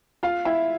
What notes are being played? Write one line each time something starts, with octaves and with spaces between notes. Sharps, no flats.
F4 F5
E4 E5